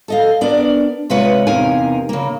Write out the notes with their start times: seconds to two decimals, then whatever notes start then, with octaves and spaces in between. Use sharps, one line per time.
0.08 A4 D#5 F5
0.41 B3 D4 A#4 D5
1.10 C3 G#3 F4 B4 C#5 F#5
1.47 E2 C3 D#4 A#4 F5 G#5
2.09 C#3 A#3